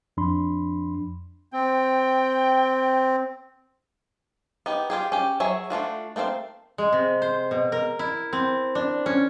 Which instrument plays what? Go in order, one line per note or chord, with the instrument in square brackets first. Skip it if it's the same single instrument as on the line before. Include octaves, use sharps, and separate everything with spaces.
[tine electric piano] F2 F3 D4 B5 C6
[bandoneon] C4 [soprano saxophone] G5
[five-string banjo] B3 D#4 G4
F4 G4 G#4
C#4 G4
F#3 G#4 C#5 E5
A3 D4 F4 F#4
A3 A#3 C4 C5 F5
[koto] G#3
C3
C5
B2
A#4
E4
C4
D4
C#4